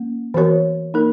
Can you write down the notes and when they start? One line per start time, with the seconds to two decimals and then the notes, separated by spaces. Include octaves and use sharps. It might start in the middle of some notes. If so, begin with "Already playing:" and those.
Already playing: A#3 C#4
0.34 E3 B3 F#4 A#4 C#5
0.94 A#3 D#4 A#4